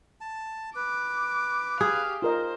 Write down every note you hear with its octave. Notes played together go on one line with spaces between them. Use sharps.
A5
B4 D6
G4 G#4 F5
F4 A#4 C5 D#5